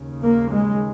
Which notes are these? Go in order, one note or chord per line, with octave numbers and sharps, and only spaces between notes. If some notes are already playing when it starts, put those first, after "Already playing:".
Already playing: D#2 C#3
A#3
G#3